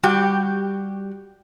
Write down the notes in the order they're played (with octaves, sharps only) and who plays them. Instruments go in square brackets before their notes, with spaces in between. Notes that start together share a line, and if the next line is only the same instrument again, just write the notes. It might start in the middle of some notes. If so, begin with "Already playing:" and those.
[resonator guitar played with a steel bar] G3 F#4 G4 G5